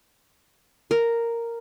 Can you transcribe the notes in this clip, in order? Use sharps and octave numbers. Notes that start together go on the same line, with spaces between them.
A#4